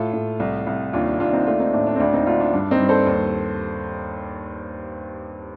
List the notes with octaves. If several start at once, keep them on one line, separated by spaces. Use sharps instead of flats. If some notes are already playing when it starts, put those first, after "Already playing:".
Already playing: A2 F4 A4
A2
C2
C2
D#2 D4 F4
D#2 D4 F4
C4 D#4
A3 D4 F4
C4 D#4
A2 D4
D4
C4
D2 D4
C4 D#4
D2 D4 F4
D4
G2 D4
C4 D#4
G2
A4 C5
D#2